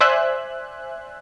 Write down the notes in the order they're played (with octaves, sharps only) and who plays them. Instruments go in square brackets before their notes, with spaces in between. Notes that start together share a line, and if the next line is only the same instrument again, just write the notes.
[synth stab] C5 D5 E5 G#5 F#6